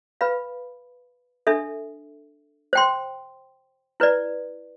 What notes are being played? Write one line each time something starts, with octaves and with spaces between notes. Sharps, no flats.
B4 F5 B5
D4 A4 E5
C5 G5 C6
E4 B4 D5